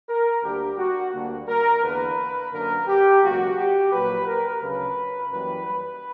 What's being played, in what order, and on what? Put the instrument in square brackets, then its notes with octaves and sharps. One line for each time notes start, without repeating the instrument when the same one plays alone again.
[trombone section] A#4
D2 D3 G3 A#3 G4
F#4
D2 D3 G3 A#3
A#4
E2 D3 A#3 B4
F#2 D3 A#3 A#4
G4
C#2 B2 F#3 A#3 F#4
G4
A#1 A#2 F#3 B4
A#4
D2 C#3 F#3 B4
F#2 E3 G3 A#3 B4
B4